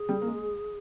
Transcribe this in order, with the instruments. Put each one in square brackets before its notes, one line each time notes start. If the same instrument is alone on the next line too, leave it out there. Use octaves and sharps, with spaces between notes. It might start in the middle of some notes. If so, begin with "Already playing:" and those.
Already playing: [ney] G#4
[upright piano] G3
A#3
G#3